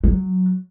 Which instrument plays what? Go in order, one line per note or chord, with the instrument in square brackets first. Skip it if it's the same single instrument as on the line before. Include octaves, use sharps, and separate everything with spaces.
[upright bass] F#3